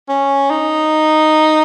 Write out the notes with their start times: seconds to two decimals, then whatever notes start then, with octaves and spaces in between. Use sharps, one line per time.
0.09 C#4
0.51 D#4